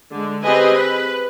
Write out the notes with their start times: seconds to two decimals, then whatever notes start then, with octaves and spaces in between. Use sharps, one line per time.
0.12 D3 G#3
0.42 C4 G4 G#4 B4 D#5 G#5
0.74 B4